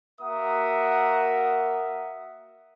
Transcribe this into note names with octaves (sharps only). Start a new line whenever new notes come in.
A#3 F#4 A#4 E5 F#5 D#6